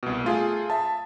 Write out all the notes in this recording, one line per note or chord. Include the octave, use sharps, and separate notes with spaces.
C2 B2
A3 F4 G#4
E5 A5